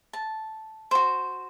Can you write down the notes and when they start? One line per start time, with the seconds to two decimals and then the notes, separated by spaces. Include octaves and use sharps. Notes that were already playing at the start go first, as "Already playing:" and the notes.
0.13 A5
0.91 F#4 C5